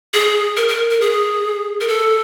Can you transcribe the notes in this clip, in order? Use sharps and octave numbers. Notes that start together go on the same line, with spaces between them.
G#4
A#4
A#4
A#4
G#4
A#4
A4